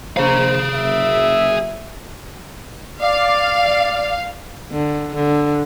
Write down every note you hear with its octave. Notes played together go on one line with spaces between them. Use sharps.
A#1 G#4 C5 F5 A#5
F#1 E5
D5 F5
D3
D3